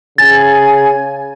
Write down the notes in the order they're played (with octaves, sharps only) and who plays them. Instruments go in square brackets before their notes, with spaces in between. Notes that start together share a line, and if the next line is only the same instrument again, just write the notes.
[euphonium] C#3 [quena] G#5 [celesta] A6